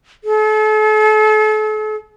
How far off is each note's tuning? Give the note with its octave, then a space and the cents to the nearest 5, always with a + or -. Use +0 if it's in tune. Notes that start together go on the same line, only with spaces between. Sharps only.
A4 -40